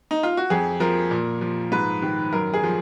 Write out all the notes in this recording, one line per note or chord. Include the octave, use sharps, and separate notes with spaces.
D#4
F4
F#4
F2 G#4
F3 A#4
A#2
F3
G#2 B4
D#3
F#2 A#4
G#4
F3